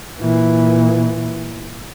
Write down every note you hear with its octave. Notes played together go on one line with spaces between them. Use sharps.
A#2 E3